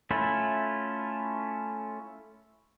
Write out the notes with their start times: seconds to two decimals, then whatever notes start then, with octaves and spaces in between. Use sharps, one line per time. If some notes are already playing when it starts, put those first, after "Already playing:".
0.11 A3 C#4 E4 F4